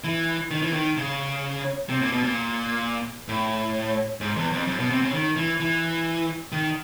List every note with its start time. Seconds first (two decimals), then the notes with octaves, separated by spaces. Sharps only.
0.04 E3
0.51 D#3
0.62 E3
0.73 D#3
0.97 C#3
1.89 C3
2.01 A#2
2.12 B2
2.24 A#2
3.28 A2
4.21 G#2
4.37 E2
4.52 F2
4.67 F#2
4.79 B2
4.91 C3
5.02 C#3
5.13 D#3
5.37 E3
5.60 E3
6.52 D#3